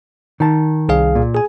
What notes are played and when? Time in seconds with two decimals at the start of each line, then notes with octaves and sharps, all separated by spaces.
0.40 D#3 A5
0.89 C2 G#4 F5
1.15 A#2
1.34 G#4 G#5